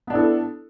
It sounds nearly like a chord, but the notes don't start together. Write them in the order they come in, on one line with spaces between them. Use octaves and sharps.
B3 D4 E4 A4